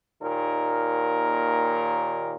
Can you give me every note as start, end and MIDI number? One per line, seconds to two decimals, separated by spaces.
0.22 2.35 39
0.22 2.35 46
0.22 2.35 51
0.22 2.35 70